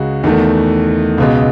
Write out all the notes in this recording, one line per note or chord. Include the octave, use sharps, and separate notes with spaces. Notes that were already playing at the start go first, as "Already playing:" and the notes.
Already playing: C#2 C#3 G#3 F#4
E2 D#3 A3
C#2 B2 G#3